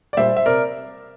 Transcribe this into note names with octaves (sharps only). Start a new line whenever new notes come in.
D5
A#2 G3 C5 E5
E5
C3 A#4 D5